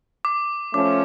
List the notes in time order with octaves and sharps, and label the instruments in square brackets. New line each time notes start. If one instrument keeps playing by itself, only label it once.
[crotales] D6
[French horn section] F3 A3 C#4 [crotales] D6